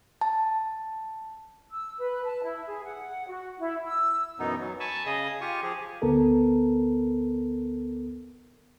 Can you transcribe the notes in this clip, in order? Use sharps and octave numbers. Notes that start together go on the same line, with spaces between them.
A5
E6
B4
A5
E4
G#4
F#5
F#4
E4
E6
F#2 B2 E3 B3 D#4
F#3
G#5 A5 B5 C#6
C#3 G#4 D#5 D#6
F4 G4 G#5 C#6
F3 G4 G#4
D2 B3 A4 A#4